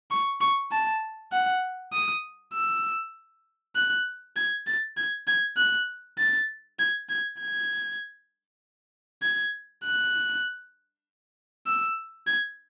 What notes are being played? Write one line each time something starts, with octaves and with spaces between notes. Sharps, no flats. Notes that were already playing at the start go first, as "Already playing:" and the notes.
C#6
C#6
A5
F#5
D#6
E6
F#6
G#6
A6
G#6
G#6
F#6
A6
G#6
G#6
G#6
G#6
F#6
E6
G#6